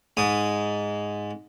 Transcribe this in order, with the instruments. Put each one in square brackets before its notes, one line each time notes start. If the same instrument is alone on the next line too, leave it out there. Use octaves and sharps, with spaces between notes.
[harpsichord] G#2 D#6